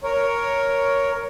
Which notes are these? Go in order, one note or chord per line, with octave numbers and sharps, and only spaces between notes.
A#4 C#5